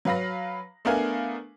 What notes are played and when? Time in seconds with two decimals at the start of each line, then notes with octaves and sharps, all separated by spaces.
0.05 F#3 B4 F5 B5 A#6
0.85 A3 B3 D4 A#4 F5 G#5